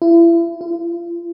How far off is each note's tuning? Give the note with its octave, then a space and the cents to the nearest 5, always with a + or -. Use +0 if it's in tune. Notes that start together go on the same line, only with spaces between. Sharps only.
E4 +35
F4 -35